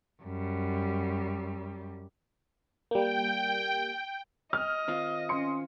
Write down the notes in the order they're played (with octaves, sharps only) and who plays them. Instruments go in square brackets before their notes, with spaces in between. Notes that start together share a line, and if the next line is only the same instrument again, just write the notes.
[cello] F#2 G3
[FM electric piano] G3 A#3 [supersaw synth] G5
[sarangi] D#5 [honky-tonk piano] F6
[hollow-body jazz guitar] D#3 C4 F4
[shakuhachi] C#4 [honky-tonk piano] C6 C#7